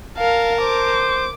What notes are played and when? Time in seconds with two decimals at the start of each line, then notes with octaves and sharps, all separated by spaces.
0.18 A#4 F5 A5
0.61 C5 D6